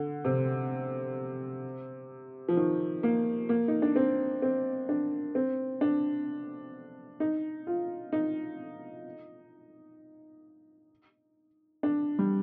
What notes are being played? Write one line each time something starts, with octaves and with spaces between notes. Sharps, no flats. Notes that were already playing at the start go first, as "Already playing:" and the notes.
Already playing: D3
C3
F3
D#3
A#3
A#3
D#4
D4
C4
C4
D4
C4
D4
D#4
F4
D#4
D4
G3